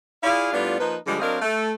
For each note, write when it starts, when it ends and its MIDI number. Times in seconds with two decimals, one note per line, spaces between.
0.23 0.49 64
0.23 0.49 65
0.23 0.49 68
0.23 0.49 74
0.23 0.49 77
0.52 0.76 45
0.52 0.76 55
0.52 0.76 59
0.52 0.76 62
0.52 0.76 65
0.79 0.96 53
0.79 0.96 58
0.79 0.96 63
0.79 0.96 71
1.07 1.17 50
1.07 1.17 53
1.07 1.17 55
1.07 1.17 56
1.20 1.37 54
1.20 1.37 60
1.20 1.37 62
1.20 1.37 70
1.20 1.37 75
1.20 1.37 77
1.41 1.71 57